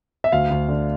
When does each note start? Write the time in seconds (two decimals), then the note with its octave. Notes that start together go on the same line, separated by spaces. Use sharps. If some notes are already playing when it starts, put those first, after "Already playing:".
0.24 E5
0.32 D2 F5
0.50 D2
0.69 D3